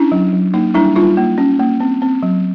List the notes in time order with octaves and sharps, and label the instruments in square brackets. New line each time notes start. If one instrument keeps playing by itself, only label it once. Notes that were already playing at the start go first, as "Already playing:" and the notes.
Already playing: [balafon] C#4 D4 E4
F#3
F#3
A#3 D#4
G3 D4 E4
G3 D#4 F4
A#3
C#4
A#3
C4
C4
F#3